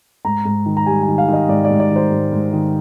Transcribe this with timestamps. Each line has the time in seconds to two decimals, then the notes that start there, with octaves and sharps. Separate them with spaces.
0.25 G#2 A#5
0.45 G#2
0.66 D#3
0.77 A#5
0.86 G3 G#5
1.03 G#5
1.08 D#3
1.18 F5
1.28 D#3
1.33 D#5
1.49 G#2 D5
1.65 D5
1.70 G#2
1.80 D5
1.90 D#3
1.96 C5
2.11 G#2
2.32 G#2
2.53 D#3